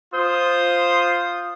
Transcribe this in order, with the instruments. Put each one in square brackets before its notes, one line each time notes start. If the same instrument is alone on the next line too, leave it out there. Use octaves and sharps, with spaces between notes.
[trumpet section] F4 D#6 [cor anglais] C5